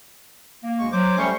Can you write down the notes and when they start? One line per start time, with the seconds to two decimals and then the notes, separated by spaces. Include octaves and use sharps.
0.64 A#3
0.79 D2 G#3 C#6
0.92 F#3 C5 D6
1.17 G3 A3 C#4 C5 C#6